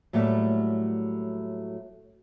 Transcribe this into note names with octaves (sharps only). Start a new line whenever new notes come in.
A2 F#3 G3 A3 A#3